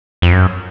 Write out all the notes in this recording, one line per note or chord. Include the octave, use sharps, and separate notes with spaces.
F2
F#2